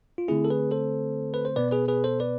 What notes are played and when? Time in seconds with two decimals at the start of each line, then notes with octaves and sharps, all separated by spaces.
0.18 F4
0.28 D3 A3 C4 E4 G#4
0.45 A4
0.50 G#4 B4
0.71 A4 C5
1.34 B4
1.45 C5
1.56 B2 B3 B4 D5
1.71 G#4 B4
1.88 G#4 B4
2.04 A4 C5
2.20 B4 D5